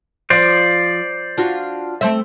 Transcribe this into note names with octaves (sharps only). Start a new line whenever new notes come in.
F3 C5 D5
D4 F4 F#4
A3 C4 E5